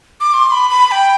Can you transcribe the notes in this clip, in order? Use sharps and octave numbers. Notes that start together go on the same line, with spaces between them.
D6
C6
B5
B5
B5
G5